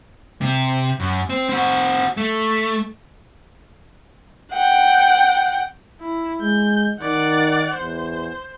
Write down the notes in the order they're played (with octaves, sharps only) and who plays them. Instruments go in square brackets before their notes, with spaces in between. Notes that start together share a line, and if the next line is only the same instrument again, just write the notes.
[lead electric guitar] C3
F#2
C4
C4 F#4
A3
[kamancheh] F#5 G5
[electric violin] E4
[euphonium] G#3 [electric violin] G6
[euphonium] D#3 [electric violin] D5 F#5
[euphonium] E2 [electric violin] C5